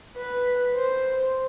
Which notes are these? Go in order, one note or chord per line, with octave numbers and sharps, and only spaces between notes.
B4
C5